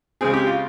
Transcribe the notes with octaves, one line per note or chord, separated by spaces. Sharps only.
C#3 G#3 C4 G#4
G4
F4